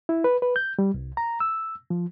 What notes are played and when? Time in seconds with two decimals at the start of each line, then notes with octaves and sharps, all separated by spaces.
0.09 E4
0.24 B4
0.42 B4
0.56 G6
0.79 G3
0.94 C2
1.17 A#5
1.40 E6
1.90 F3